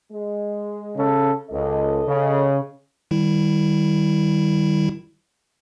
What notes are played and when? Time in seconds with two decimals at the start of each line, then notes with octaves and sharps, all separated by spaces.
0.12 G#3
0.96 C#3 C#4 A4
1.51 C#2 A4 D#5
2.08 C#3
3.11 D#3 G3 E4